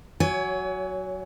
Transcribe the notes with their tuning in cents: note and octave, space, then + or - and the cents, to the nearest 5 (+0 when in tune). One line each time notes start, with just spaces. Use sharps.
F#3 +5 C#5 +30 G#5 +0